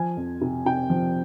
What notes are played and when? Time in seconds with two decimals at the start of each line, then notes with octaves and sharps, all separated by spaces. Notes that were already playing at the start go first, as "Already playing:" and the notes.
Already playing: F3 G#5
0.17 F2
0.41 C3
0.66 C3 G5
0.90 F3